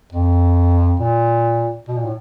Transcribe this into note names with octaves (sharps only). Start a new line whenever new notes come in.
F2
A#2
B2
A#2
A2